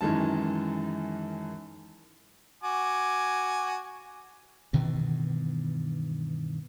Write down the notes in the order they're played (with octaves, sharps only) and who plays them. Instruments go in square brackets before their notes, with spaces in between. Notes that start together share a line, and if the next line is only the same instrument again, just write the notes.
[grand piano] F#2 D#3 E3 G#3 A5
[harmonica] F#4 G#5 D6
[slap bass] G2 B2 D#3 E3